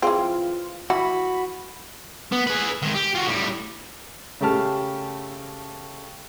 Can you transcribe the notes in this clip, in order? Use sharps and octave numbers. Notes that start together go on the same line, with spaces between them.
E3 C4 F4 G#4 F5
E3 F#4 B5
B3
G#4 B4
D#3 G#3
G4
F4 F#4
A2 G3
C#3 A3 G4 A5 F6